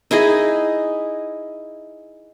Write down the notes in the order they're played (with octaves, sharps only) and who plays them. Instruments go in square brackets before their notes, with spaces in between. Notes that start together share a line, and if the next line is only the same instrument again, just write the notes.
[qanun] D#4 E4 G#4 D#5